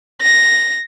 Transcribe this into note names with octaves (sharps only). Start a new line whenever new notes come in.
A#6